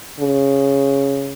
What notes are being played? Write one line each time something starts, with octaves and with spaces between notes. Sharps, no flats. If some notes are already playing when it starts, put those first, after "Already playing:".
C#3